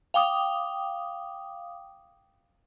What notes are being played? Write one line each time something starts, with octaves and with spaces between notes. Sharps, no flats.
F5 G5 D6 D#6